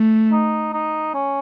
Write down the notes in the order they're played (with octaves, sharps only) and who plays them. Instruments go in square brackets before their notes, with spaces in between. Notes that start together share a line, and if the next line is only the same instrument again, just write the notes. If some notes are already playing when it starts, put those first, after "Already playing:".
Already playing: [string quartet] A3
[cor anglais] D#4
D#4
C#4